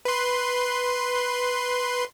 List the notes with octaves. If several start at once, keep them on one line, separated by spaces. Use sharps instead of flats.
B4 C6